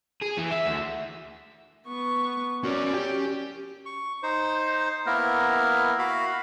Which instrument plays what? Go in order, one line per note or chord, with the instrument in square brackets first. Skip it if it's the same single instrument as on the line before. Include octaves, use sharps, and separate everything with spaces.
[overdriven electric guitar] G#4
E3
E5
D2
[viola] B3 C#6
[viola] C#4 D5 [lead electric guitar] F#4 A#4
[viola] C#4 [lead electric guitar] G4
[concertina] C#6
D#4 C5
A#3 B3 E4 A#4
F#4 F5 B5